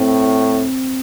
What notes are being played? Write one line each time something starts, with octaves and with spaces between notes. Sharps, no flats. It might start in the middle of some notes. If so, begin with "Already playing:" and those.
Already playing: A2 C4